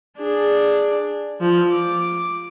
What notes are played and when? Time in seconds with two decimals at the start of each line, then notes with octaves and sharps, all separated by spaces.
0.18 D4 G#4
1.41 F3
1.72 D6